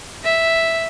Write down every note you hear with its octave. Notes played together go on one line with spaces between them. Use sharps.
E5